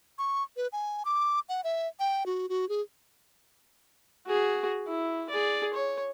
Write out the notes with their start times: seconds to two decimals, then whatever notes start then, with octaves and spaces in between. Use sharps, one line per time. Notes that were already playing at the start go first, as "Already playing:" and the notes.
0.18 C#6
0.57 B4
0.72 G#5
1.05 D6
1.49 F#5
1.64 E5
2.00 G5
2.26 F#4
2.49 F#4
2.69 G#4
4.27 F#4 G#4
4.88 E4
5.30 G#4 D5
5.74 C#5